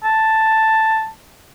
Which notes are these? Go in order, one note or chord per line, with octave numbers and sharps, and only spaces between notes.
A5